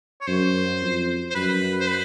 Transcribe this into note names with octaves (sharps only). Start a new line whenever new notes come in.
C#5
F#2 C5
F2
C5
F#2 B4
C5
B4